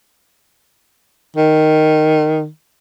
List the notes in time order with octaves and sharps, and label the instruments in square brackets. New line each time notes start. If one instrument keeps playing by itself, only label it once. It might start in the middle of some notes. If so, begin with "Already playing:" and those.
[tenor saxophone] D#3